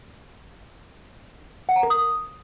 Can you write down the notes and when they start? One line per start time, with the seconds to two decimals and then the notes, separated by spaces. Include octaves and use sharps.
1.69 F#5
1.76 A#5
1.83 A#4
1.90 D#6